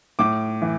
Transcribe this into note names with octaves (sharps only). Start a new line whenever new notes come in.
A2 D6
E3